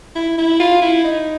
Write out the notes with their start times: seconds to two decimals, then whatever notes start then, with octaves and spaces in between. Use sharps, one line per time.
0.15 E4
0.38 E4
0.60 F4
0.82 E4
1.04 D#4